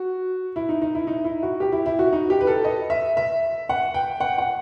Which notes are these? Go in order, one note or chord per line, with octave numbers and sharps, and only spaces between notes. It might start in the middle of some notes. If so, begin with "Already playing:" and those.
Already playing: F#4
E4
D#4
D#4
E4
D#4
E4
F#4
G4
E4
E4
F#4
D#4
G4
B4
A4
D#5
E5
E5
F#5
G5
F#5
F#5